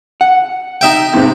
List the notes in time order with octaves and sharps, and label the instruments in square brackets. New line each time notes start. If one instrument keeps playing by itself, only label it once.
[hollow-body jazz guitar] F#5
[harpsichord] D#4 E5 G5
[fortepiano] E2 G#2 C3